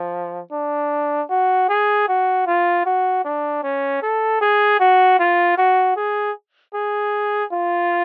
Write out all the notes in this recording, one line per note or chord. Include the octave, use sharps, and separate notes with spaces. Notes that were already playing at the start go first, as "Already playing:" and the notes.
Already playing: F3
D4
F#4
G#4
F#4
F4
F#4
D4
C#4
A4
G#4
F#4
F4
F#4
G#4
G#4
F4